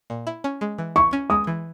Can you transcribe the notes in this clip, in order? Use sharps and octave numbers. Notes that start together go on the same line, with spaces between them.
A#2
E4
C#4
G#3
E3
E4 C#6
C#4
G#3 D#6
E3